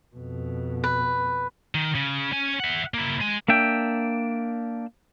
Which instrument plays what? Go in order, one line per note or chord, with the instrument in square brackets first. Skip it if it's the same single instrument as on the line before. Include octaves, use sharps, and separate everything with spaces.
[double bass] F2 B2
[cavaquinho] B4
[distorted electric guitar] D#3
C#3
C#4 G#5
E5 F#5
A#3 E4
G#3 G#5
[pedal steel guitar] A#3 D4 E5 G5